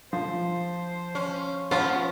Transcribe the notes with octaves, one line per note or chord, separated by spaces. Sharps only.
F3 C5
C#4
F3 B3 C#4 F4